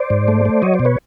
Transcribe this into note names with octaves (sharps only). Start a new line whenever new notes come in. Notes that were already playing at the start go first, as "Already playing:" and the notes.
Already playing: C5 D5
G#2
A3
A3
F#3 C#5 D#5
C5 D5
B2
B4 C#5